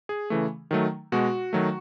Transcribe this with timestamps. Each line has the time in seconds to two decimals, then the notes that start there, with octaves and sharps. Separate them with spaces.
0.09 G#4
0.30 C#3 E3 A3
0.71 D#3 F#3 A3
1.12 B2 G#3 F#4
1.53 D#3 F#3 A3